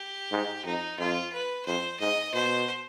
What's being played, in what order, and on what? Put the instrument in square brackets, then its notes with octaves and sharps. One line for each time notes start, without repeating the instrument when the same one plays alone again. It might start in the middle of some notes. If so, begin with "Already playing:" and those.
Already playing: [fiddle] G4
[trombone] G#2
[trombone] F2 [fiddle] D#4
[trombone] F2 [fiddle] F4
[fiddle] B4
[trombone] F2 [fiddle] C5
[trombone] G#2 [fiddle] D#5
[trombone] B2 [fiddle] C5